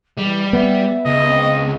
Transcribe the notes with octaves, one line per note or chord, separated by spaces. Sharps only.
E3 G3
B3 E5
C#2 D#5
C4